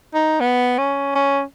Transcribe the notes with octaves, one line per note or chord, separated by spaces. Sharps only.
D#4
B3
C#4
C#4